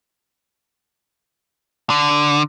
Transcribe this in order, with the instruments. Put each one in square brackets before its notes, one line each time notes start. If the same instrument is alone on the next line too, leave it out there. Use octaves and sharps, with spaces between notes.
[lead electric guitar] D3